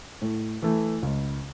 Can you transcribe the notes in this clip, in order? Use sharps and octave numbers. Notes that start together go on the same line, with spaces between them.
A2
E3 A3
C#2